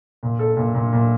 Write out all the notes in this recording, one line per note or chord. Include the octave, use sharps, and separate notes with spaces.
A#2
A4
A#2
A#2
A#2